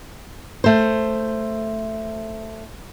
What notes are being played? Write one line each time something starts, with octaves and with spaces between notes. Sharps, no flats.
A3 C5